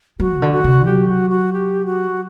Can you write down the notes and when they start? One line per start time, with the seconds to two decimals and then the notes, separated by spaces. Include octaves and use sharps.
0.20 F#3 F#4
0.36 C3
0.42 D3
0.52 F#4
0.64 C3
0.85 F#3 G4
1.08 F#4
1.30 F#4
1.53 G4
1.86 F#4